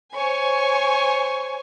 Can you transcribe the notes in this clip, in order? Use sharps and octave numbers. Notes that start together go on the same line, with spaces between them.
C5 C#5 G#5 C#6